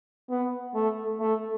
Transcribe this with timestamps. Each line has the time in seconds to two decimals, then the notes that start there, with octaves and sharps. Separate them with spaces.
0.30 B3
0.75 A3
1.20 A3